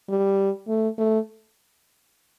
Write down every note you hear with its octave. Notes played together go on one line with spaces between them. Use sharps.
G3
A3
A3